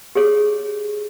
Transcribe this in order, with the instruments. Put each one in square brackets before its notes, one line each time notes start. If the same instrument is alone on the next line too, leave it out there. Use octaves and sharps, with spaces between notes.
[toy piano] G4 G#4 C#5